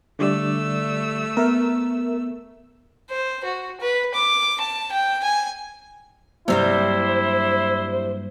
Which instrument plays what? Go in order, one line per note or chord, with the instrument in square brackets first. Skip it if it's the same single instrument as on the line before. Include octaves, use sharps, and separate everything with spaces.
[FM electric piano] D3 G3 D5 [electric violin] A3 E6
[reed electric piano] B3 [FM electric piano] A#4 E5
[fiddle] C5
F#4
B4
D6
A5
G5
G#5
[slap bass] G2 F#3 A#3 [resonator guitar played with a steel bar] C3 G3 C4 [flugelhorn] E4 [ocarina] C5